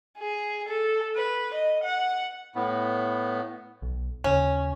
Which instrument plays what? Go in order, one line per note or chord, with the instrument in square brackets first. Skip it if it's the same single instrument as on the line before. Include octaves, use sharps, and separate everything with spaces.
[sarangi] G#4
A4
B4
D#5
F#5
[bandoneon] A2 B3
[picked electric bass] B1
[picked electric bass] D#2 C#3 [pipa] C#4